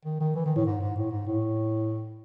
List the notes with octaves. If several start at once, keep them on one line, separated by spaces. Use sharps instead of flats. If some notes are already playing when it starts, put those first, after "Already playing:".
D#3
D#3
E3
D#3
A2
G#2
G#2
A2
G#2
A2